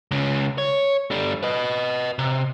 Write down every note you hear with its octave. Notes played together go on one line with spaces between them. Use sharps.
C#2 C#3
C#5
D3 G3
B4 D#5
C3